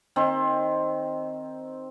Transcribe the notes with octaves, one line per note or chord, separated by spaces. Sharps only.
D#3 C4